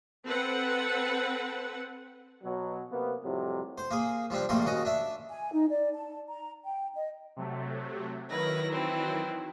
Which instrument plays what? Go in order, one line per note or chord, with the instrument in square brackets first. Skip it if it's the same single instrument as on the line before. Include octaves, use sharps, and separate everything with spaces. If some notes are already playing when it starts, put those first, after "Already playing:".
[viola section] C4 A4 B4 F#5
[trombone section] B2 F#3
C3 A#3 B3
F2 A2 C3 F#3 G3
[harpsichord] C5
A#3 G#4
F3 G3 C4 D4
A#1 G2 G3 A3 A#3 C6
D#2 C#3 F#4 D#5
D4 E5
[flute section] G#5
D#4
D5
A5
A#5
G5
D#5
[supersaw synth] C3 F#3 A3
[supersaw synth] D#3 F#3 E4 [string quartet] A#4 B4 A#6
[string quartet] E3 C4